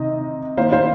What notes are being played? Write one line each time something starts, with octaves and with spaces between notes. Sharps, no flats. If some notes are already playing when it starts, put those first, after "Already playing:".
Already playing: C3 D#3 D#4 D#5
D#3 A#3 D#4 C5 F5
C5 F5